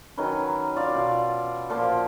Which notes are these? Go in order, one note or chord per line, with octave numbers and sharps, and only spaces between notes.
D#3 F#3 C#4 B4
F4 D5 F5
B2 F4
A#2 F3 C5 D6